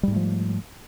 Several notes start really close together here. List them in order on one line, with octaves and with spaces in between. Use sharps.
G3 G#2 A3 F3